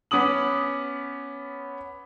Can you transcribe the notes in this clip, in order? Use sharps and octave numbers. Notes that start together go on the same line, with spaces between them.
B3 C#4 D6 D#6 F#7